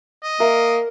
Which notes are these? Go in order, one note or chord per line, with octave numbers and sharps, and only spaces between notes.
D#5
A#3 A#4 E5